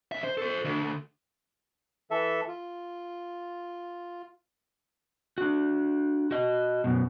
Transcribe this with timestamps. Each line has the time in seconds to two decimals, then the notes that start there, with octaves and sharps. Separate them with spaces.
0.12 C2 E5
0.24 C5
0.37 A4 C5
0.65 D2
2.11 E3 A4 E5
2.48 F4
5.38 D4 F#4
6.31 F#4 D#5
6.84 F#2 B2